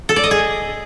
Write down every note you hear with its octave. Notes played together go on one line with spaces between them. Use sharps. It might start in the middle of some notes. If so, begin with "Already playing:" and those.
A4
D5
D#5
G#4